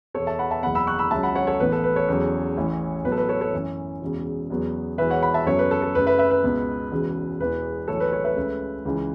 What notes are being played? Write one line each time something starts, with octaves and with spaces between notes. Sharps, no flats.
E2 B2 B3 A4 C#5
E5 A5
F#5 B5
E5 A5
F#1 E2 B2 F#5 B5
B5 E6
C#6 F#6
B5 E6
C#2 C#3 F#3 C#4 E5 A5
F#5 B5
C#5 F#5
A4 C#5
A1 A2 E3 B3 B4
A4
B4
A4 C#5
E2 C#3 F#3
A1 A2 E3 C#4
A1 A2 F#3 B3 B4
A4
B4
A4 C#5
A4 C#5
F#2 E3 A3 C#4
E1 E2 C#3
E2 C#3 F#3 B3
E1 E2 E3 B4 E5
C#5 F#5
F#5 B5
E5 A5
F#2 C#3 F#3 B3 A4 C#5
B4
A4
A4
F#2 C#3 A3 B4
B4 E5
B4 E5
B4
C#2 B2 B3
E1 E2 C#3
E1 E2 E3 B3 B4
B1 A2 E3 A4 C#5
B4
A4 C#5
B4 E5
C#2 C#3 A3
C#2 C#3 E3